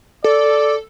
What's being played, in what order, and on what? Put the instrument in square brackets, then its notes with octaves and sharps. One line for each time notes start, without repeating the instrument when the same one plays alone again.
[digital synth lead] A4 [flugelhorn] D5